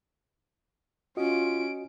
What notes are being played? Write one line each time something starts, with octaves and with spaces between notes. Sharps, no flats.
C#4 F4 F#4 D#5 D7